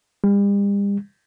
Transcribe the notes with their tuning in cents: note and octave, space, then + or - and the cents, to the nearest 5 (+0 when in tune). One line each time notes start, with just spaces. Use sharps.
G3 +40